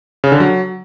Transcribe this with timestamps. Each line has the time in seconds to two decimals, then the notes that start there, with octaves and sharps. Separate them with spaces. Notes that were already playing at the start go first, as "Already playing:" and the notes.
0.24 C#3
0.32 D3
0.40 F#3